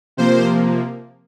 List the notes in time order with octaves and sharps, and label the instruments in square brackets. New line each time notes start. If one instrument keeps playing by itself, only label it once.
[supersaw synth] C3 F3 A#3 C5